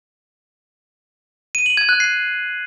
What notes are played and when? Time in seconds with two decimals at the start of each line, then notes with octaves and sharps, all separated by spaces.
1.55 D#7
1.66 F#7
1.77 G#6
1.89 F#6
2.00 C7